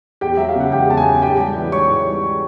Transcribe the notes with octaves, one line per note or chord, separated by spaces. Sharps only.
E2 G4 G5
F#3 E5
F5
C#3 F#5
E2 G4 G5
E2 A5
G#4 G#5
F#3
G#2 G4 G5
G3
E3
G#2 C#5 C#6
G#2
G3